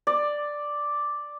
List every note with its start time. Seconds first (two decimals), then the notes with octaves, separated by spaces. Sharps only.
0.07 D5